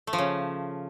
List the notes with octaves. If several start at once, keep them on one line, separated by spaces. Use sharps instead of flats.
A3
F3
C#3